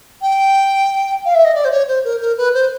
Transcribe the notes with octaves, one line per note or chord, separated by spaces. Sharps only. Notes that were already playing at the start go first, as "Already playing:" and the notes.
G5
F5
E5
D#5
D5
C5
C#5
C5
A#4
A#4
B4
C5